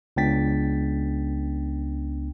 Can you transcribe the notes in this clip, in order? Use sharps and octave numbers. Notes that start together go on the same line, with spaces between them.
C#2 B3 D4 G5 A6 B6